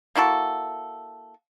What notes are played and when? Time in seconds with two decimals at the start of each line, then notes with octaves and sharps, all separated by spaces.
0.15 A#3 E4 F#4 A4